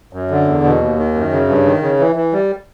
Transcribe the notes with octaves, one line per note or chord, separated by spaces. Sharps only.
F#2
D3
E2
B2
D#2
D#3
F#2
C#3
G2
D#3
C#3
E3
E3
G3